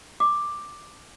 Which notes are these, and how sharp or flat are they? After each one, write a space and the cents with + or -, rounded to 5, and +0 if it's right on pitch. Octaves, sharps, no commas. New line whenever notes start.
D6 +10